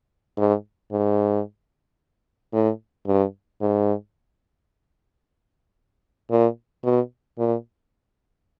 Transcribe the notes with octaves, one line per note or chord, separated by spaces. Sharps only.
G#2
G#2
A2
G2
G#2
A#2
B2
A#2